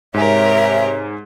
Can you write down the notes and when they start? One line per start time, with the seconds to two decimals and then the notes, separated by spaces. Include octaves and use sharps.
0.14 G#2 C3 G4 A#4 C#5 E5 G#5